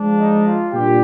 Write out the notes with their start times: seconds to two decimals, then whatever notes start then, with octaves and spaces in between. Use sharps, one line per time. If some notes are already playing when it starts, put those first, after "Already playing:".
Already playing: F3 G#3 D4
0.17 D#4
0.45 F4
0.73 A#2 G3 D4 G4